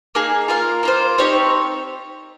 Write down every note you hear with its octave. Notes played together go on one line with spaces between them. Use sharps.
A#3 D#4 G#4
F4 A#4 F5
A#3 F4 C5
C4 D#4 G4 C#5